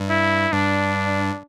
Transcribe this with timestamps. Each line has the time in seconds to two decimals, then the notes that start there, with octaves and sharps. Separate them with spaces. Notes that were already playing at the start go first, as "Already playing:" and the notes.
Already playing: G2
0.09 E4
0.52 G2 D4